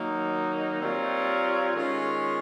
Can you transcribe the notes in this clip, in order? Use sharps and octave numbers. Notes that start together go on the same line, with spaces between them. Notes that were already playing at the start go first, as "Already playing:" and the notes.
Already playing: D#3 F#3 A#3 D#4
G3 C4 F4 A#4 C#5
D#3 G#3 C#4 F4 G#4